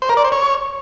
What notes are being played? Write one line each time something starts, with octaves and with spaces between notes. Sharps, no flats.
C5
A#4
D5
C5
C#5